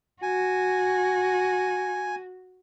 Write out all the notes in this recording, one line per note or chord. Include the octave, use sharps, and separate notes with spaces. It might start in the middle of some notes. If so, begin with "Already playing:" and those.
F#4 G#5